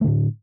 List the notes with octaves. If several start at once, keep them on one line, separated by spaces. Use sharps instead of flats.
A2 D3 A3